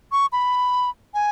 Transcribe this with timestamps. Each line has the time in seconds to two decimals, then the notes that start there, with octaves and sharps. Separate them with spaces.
0.12 C#6
0.32 B5
1.14 G#5